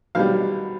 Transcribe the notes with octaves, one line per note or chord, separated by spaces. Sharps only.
B1 B2 G3 F5